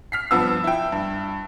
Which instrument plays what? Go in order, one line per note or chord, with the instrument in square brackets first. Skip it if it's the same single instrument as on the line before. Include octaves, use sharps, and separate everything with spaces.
[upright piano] F6 B6 C7
G2 F3 B3 E6
E4 G5
G2